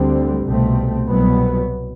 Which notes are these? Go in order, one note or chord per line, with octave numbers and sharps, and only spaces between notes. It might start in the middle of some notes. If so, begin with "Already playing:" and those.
Already playing: D2 D3 G3 C4
C2 B2 A3 C4
C2 B2 F#3 B3